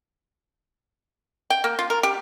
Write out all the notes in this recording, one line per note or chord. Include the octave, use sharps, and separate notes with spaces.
G5
A#3
F4
A#4
G4